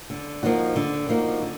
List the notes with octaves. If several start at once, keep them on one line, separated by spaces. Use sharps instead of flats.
D3
F3 A#3 D#4 F#4
D3
F3 A#3 D#4 F#4
D3